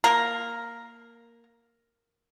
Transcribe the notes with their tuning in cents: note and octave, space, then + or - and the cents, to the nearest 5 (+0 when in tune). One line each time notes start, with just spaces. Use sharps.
A#3 +0 A#4 +0